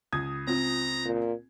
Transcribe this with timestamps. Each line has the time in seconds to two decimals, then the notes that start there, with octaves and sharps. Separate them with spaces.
0.12 C#2 D#6 G#6
0.47 C4 F4 A#5
1.05 A#2